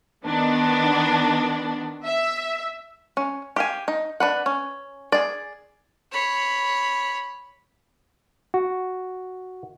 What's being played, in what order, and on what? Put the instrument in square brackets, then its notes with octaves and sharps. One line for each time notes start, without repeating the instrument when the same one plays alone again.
[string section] D#3 B3 D4
E5
[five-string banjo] C#4
G4 F5 G#5
D#4
D4 B4 F#5
C#4
G#4 D5
[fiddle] C#5 B5
[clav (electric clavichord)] F#4